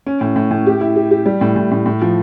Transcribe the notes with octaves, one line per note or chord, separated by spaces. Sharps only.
C#4
A2
A2
A2
G4
E4
G4
G4
G3
A2
A2
A2
A2
F3